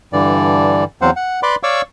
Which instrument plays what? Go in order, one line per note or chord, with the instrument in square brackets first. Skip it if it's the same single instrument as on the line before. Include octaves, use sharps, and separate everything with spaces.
[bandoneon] G2 D3 E3 D5
E2 F#3 C4 C5 F5 F#5
F#5
B4 D5 B5 C6 D6
C#5 D5 F5 C#6 D6 E6